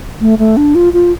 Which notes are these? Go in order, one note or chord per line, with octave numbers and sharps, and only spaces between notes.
A3
A3
D4
F4
F4